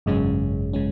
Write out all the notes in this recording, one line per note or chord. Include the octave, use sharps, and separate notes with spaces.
G#1 F#2 C#3 G#3 C#4
C#3 G#3 C#4